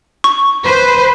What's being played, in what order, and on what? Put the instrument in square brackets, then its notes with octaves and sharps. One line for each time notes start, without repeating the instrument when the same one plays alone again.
[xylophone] C#6
[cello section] B4 C5